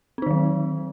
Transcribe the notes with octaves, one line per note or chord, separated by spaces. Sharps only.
D#3 F#3 C4 D#4